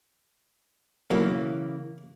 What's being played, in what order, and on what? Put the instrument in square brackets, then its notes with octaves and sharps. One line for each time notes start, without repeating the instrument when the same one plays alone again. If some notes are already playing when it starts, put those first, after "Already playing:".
[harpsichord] B1 [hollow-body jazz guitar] C#3 E3 A#3